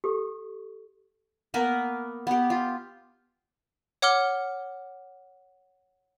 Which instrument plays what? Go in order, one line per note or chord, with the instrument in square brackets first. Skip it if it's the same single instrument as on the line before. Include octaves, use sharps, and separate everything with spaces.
[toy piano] G4 A4 C#6
[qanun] A#3 B3 A#4 B4
B3 G4
F4
[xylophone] C#5 F#5 D6 F6 G7